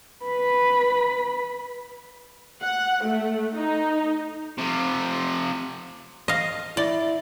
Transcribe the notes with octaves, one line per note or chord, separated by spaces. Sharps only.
B4 B5
F#5
A3
D#4
C3 F3
D#5 F5
E4 D5